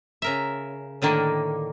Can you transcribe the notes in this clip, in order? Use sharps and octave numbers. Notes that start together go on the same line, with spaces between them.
C#3 A#4 E5
A2 D3 D#3 A#3